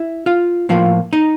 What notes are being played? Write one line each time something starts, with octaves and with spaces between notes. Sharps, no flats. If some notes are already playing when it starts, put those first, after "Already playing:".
Already playing: E4 E5
F4 F5
A2 F3 A#3 F4 F5
D#4 D#5